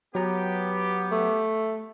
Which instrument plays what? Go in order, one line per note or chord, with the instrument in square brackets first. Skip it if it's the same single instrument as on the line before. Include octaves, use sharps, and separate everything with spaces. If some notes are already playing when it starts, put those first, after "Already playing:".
[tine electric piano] F#3 A#5 [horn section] B3 G4
[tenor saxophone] A3